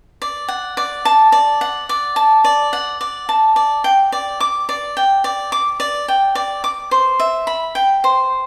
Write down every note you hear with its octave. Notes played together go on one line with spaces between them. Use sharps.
D5
F#5
D5
A5
D5
F#5
D5
A5
D5
F#5
D5
A5
D5
G5
D5
D6
D5
G5
D5
D6
D5
G5
D5
D6
C5
E5
B5
G5
C5